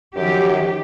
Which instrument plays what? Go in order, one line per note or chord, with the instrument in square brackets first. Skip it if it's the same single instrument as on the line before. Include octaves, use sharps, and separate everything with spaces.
[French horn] F#2 [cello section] D#3 F3 G4